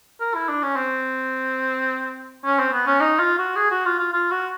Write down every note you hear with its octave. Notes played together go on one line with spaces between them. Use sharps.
A#4
E4
D4
C#4
C4
C#4
C4
B3
C#4
D#4
F4
F#4
G#4
F#4
F4
F4
F4
F#4